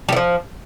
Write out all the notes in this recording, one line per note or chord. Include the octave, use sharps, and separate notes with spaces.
E3 F3 G3